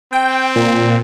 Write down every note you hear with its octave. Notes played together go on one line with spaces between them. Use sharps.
C4 G5
A#2